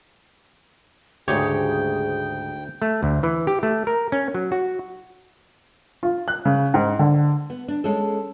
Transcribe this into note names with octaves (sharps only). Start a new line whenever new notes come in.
D2 G#2 C#3 G4 G#4 C#5 G5
A3
D2
E3
G4
A3
A#4
C#4
F#3
F#4
F4
F#6
C#3
G#2
D3
B3
D4
G#3 C#4 A4